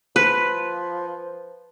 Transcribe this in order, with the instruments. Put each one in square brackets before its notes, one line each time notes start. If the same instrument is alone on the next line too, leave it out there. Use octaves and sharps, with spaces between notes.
[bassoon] F3 [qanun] B4